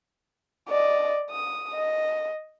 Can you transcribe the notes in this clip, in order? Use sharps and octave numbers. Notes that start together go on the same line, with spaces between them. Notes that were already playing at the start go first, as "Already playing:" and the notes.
D5 D#5
D#6
D#5